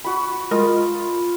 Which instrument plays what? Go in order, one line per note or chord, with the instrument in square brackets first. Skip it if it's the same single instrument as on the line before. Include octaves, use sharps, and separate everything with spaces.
[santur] F#4 B5
[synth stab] G#3 A#4 D#5 [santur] F4